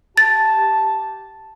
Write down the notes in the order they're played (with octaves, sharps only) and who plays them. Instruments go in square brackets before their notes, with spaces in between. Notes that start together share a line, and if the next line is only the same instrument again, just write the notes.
[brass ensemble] G4 A5 [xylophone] A6